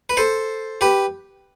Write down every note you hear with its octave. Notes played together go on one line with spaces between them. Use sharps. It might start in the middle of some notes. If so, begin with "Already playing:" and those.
B4
A4 C5
G4 B4